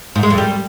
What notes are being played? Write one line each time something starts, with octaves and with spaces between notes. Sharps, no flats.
G#2
G#3
F2
G3